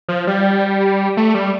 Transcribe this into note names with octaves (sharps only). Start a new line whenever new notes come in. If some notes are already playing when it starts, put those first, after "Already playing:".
F3
G3
A3
G3